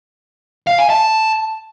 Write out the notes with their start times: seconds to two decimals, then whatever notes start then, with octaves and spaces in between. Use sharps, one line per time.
0.67 F5
0.78 G#5
0.90 A5